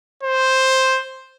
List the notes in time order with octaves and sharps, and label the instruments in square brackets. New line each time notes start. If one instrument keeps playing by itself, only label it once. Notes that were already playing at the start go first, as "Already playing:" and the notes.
[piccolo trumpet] C5